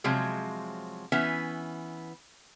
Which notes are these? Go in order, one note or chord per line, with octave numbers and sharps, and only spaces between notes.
C3 F3 F#3 G#3
E3 B3 C#4 E5